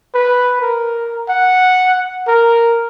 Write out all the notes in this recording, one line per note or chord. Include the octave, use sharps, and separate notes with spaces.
B4
A#4
F#5
A#4